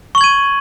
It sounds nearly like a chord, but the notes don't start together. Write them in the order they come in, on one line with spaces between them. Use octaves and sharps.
C#6 F#7 G#6 D#7